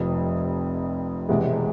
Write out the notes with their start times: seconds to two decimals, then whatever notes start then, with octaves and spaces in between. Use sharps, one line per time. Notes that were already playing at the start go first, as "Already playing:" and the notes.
Already playing: F1 F2 C3 F3
1.29 E1 E2 C3 E3 G#3